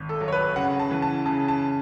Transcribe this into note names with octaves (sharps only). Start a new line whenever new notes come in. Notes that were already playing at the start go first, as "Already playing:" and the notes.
Already playing: G#1
A4
F#3
C#5
B4
C#3 F#5
A5
E3
A5
C#3 A5
A5